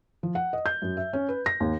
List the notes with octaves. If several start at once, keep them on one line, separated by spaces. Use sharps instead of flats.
F3
F#5
D#5
G6
F#2
E5
C#4
B4
A#6
D#2